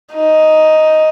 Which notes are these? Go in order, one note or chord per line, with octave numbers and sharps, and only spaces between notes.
D#4